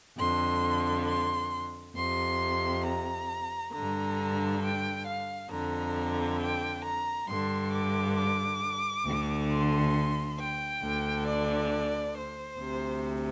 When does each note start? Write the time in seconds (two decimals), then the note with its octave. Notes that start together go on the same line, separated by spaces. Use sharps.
0.18 F2 D3 C6
1.07 C6
1.96 F2 C3 C6
2.85 A#5
3.73 D3 A#5
3.78 G2
4.62 G5
5.06 F5
5.51 F2 D3 A#5
6.40 G5
6.83 A#5
7.27 G2 D3 C6
7.72 D6
8.16 D6
9.05 D2 D3
9.50 C6
10.38 G5
10.83 D2 D3
11.27 D5
12.16 C5
12.60 D2 C3